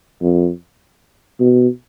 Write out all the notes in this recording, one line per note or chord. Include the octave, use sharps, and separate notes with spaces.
F2
B2